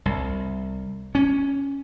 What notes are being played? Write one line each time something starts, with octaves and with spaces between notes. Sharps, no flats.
C2
C#4